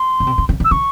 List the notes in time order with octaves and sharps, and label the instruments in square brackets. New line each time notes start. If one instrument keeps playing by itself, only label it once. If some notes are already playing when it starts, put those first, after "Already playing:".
Already playing: [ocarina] C6
[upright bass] C#3
C3
C#3
C#3
C#3
[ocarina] E6
[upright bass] C#3 [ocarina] C#6